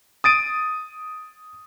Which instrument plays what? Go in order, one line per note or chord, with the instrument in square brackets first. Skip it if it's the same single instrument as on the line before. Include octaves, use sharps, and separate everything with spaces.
[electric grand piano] D#6 A6 D7 D#7